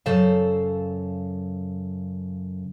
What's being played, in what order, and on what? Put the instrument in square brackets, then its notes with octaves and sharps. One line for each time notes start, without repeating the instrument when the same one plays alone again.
[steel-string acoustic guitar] F#2 C#3 A4 C5 F5